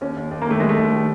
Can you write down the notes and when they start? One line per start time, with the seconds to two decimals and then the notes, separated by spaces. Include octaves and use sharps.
0.01 D#2 C#4
0.16 D#2
0.31 D#2
0.42 A#3
0.47 D#3 A3
0.60 G3 G#3
0.69 A3
0.77 D#2
0.92 D#3